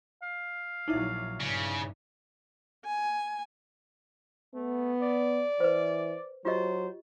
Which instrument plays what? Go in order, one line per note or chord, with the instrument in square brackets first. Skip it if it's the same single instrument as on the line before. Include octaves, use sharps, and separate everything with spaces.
[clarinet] F5
[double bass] A#1 F#3 [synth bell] D#4 E4 E5
[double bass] G2 [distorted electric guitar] C#3
[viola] G#5
[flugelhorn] A3 [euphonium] B3
[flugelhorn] D5
[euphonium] E3 [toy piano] B4 C5
[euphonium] F#3 [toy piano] F4 G4 D#5 [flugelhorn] C5